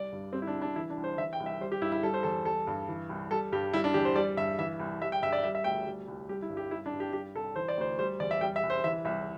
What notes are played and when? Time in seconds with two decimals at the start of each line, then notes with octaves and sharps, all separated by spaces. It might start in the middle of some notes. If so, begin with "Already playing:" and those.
Already playing: C2 G3 D5
0.12 G2
0.33 G3 C4
0.42 E4
0.47 D4
0.54 C2
0.62 D4
0.76 E3 E4
0.90 D4
0.97 C2
1.04 C5
1.18 E3 E5
1.33 G5
1.40 C2
1.46 E5
1.61 G3 C5
1.72 G4
1.82 G2 E4
1.92 E4
2.03 G3 A4
2.14 C5
2.23 E2 A4
2.45 G3 A4
2.67 G2
2.89 E3
3.09 C2
3.30 G3 A4
3.52 G2 G4
3.74 G3 E4
3.84 D4
3.94 E2 G4
4.05 C5
4.16 G3 D5
4.37 G2 E5
4.59 E3 E5
4.80 C2
5.01 G3 E5
5.12 G5
5.22 G2 E5
5.33 D5
5.43 G3 E5
5.55 E5
5.64 D2 G5
5.86 G3
6.08 C2
6.29 G3 G4
6.42 E4
6.50 G2
6.57 G4
6.71 G3 E4
6.86 D4
6.93 G2
7.00 G4
7.13 G3 G4
7.35 C2 A4
7.56 E3 C5
7.68 D5
7.78 D2 C5
7.99 G3 C5
8.20 E2 D5
8.31 E5
8.41 G3 G5
8.56 E5
8.63 C2
8.70 C5
8.84 E3 E5
9.05 C2 E5